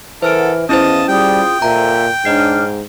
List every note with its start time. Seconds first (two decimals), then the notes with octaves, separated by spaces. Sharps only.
0.22 E3 A4 A#4 C5 F#5 F6 D7
0.69 E2 C#4 E4 C5 D#5 F5 A5
1.08 G3 F4 G#4 G5 D#6
1.62 A#2 A4 C5 E5 A#5
2.25 G#2 D4 C#5 D#5 F6 C7